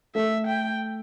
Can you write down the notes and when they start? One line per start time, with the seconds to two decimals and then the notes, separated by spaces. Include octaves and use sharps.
0.15 A3 A4 E5
0.47 G5